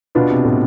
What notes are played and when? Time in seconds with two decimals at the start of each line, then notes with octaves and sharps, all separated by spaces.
0.15 B2 B3 D4 F4
0.30 C3
0.45 A2